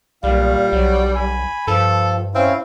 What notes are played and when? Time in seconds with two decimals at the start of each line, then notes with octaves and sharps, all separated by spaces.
0.24 B1 A#2 G3 F5
0.72 B1 F#3
1.16 G#5 B5
1.67 G2 F3 A4
2.35 C4 C#4 E4 F5